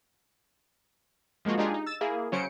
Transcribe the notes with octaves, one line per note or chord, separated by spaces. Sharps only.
F3 G#3 A#3 F4 F#4
G#3 D4 D#4 F4 G4 G#4
D#4
E6 A6 E7
A#3 E4 G#4
C#3 F#3 C#4 C5 C#7 D7